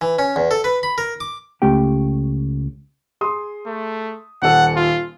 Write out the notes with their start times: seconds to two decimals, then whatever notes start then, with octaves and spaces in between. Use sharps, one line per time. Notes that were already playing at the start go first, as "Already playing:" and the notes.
0.01 E3
0.19 C#4
0.36 E2
0.51 A4
0.64 B4
0.83 B5
0.98 A#4
1.20 D6
1.62 C#2 A3 C#4 G4 G5
3.21 G#4 C6 D#6
3.67 A3
4.42 D#1 A4 F#5
4.76 F4